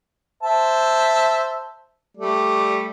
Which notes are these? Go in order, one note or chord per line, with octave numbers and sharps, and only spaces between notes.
C5 E5 A5
G3 A3 D5